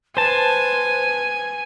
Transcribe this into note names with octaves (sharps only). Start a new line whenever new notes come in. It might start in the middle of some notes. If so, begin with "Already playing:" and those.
B4 C5 G#5 A5